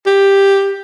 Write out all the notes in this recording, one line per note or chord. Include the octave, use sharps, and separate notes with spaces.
G4